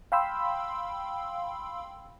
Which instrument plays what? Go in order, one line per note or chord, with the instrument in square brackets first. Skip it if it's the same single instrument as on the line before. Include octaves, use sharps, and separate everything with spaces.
[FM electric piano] F5 G5 B5 C6 E6